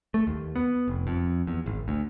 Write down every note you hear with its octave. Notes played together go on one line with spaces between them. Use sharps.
A3
D#2
B3
F1
F2
E2
G#1
D2